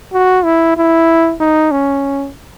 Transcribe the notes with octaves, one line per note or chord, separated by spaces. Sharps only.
F#4
E4
E4
D#4
C#4